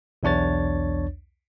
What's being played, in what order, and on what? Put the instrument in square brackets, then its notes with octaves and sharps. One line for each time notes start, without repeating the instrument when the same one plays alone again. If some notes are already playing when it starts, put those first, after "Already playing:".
[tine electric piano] B1 E2 D4 C#5 A6